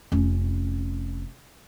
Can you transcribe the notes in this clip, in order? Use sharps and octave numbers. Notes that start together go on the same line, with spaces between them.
F1 C#4